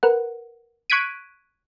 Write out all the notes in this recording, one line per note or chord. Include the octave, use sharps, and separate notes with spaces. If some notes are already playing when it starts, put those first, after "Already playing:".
A#4 B4 F#5
C#6 F#6 G#6 B6 D7 D#7